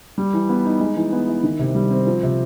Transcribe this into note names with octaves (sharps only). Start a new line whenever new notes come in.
G3
E3
B3
D#4
G#3
E3
B3
E4
D#3
C3
G3
C4
F3
C3